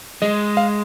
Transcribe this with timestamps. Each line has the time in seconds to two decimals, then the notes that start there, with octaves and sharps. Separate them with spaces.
0.22 G#3 D#5
0.57 F5